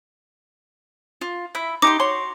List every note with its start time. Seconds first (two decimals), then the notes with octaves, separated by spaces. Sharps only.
1.21 F4
1.55 E4 E5
1.82 D#4 G4 C6 D6
2.00 F#4 C#5 C6